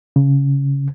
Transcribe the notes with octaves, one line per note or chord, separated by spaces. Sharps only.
C#3